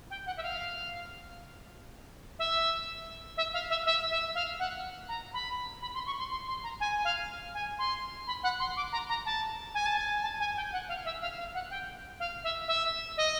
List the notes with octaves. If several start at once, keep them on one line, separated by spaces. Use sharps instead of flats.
G5
F#5
E5
F5
E5
E5
F5
E5
E5
E5
F5
F#5
A#5
B5
B5
C6
C#6
C6
C6
C6
A#5
G#5
F5
G#5
C6
B5
F#5
C6
D6
A#5
A#5
A5
G#5
A5
G#5
A5
G#5
G5
F#5
F5
E5
F5
F5
F#5
G5
F5
E5
E5
D#5